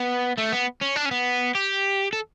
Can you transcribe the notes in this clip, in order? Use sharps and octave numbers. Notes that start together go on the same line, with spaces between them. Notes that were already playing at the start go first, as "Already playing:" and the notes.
Already playing: B3
A3
B3
C#4
D4
C#4
B3
G4
A4